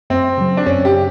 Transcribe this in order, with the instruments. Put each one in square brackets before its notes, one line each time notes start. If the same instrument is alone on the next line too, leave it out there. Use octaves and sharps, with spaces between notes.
[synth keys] F#2 [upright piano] C4
[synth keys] C#3 F#3
[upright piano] D4
[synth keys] F#2 [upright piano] C#4
[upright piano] G4
[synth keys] C#3